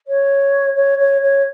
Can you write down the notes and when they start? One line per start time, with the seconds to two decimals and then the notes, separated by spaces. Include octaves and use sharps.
0.07 C#5
0.75 C#5
0.98 C#5
1.21 C#5